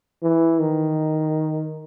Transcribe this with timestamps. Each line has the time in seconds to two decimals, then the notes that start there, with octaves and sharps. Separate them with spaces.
0.22 E3
0.59 D#3